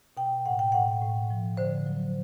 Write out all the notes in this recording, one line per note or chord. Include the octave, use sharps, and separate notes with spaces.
B2 G5
A2 F#5
G5
A2 F#5
A2
F3
D3 C5
F#3